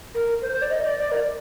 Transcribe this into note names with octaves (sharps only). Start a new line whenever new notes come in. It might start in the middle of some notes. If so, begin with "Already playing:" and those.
A#4
C5
C5
D5
D#5
D5
D5
A#4